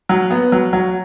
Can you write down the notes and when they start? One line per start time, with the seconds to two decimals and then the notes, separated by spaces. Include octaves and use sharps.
0.09 F#3
0.31 B3
0.52 F#3
0.73 F#3